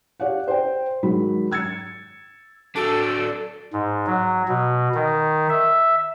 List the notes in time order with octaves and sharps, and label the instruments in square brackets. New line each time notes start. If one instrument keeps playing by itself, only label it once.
[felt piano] G4 C#5 D5 F5 F#5
C5 G5
G#2 D#3 F#3 B5
E6 G#6 A6 C#7
[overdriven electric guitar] F#3 D4 [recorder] A4
[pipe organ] G#2
F#3
B2
D#3
E5